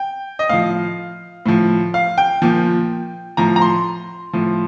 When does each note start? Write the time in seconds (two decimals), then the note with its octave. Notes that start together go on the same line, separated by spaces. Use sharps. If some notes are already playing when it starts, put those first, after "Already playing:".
Already playing: G5
0.39 D#5
0.49 A2 F3 F5
1.46 A2 F3
1.94 F5
2.18 G5
2.42 A#2 F3
3.37 A2 F3 A#5
3.56 A#5
3.62 C6
4.33 A2 F3